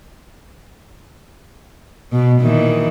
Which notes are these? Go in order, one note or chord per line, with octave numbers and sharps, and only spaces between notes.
B2
A#2 D#3 E3